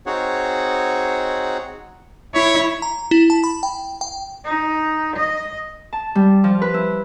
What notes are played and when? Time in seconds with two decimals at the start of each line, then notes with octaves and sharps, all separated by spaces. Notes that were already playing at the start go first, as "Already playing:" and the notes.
0.06 C4 D#4 F#4 G#4 C#5 F#5
2.34 E4 C#5
2.82 A#5
3.11 E4
3.30 A5
3.44 B5
3.63 G5
4.01 G5
4.44 D#4
5.16 D#5
5.93 A5
6.15 G3
6.44 F3
6.62 B4
6.74 E4